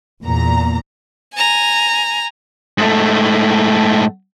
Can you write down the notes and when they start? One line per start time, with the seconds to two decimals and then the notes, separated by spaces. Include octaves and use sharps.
0.22 E2 A#2 A#5
1.34 G#5 A#5
2.78 G#2 A3